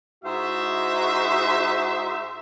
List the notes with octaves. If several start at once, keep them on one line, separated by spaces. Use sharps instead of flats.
G#2 E4 F#4 C5 D#5 E5